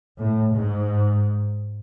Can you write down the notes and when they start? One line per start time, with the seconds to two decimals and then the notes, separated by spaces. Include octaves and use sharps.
0.18 A2
0.53 G#2